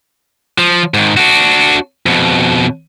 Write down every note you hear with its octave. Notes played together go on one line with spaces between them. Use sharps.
F3
G#2 D#3
D4 F#4
F2 B2